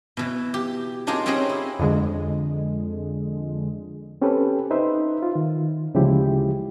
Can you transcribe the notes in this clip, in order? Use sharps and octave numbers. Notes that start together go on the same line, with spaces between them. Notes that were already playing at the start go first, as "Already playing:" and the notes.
B2 E3
G4
D4 D#4 F4 G4 G#4 A#4
C4 C#4 G4 G#4 D#5 F#5
E4
F2 D3 G#3
C4 C#4 G4 A4 B4
D#4 B4 C5 E5
F4
D#3
D2 C#3 F3 G#3 E4 G4